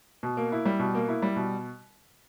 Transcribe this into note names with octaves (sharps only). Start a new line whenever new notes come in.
B2
A#3
E4
G3
B2
A#3
E4
G3
B2